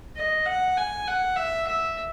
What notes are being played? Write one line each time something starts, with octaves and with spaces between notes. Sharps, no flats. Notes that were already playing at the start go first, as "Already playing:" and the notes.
D#5
F#5
G#5
F#5
E5
E5